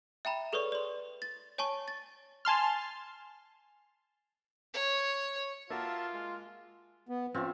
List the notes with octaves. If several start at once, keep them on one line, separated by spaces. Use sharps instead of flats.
E5 G5 A#5 B5
G#4 A4 B4 C#5 D5 C#6
D5 C6
A6
C#5 G#5 A5 C#6
A6
G#5 A5 C6 F6
C#5
A#3 F4 F#4 A#4 E5 A5
G#3
B3
F3 C4 C#4 F4 E5